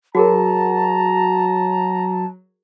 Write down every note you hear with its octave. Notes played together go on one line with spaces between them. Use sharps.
F#3 F#4 G#4 A#4 A5 A#5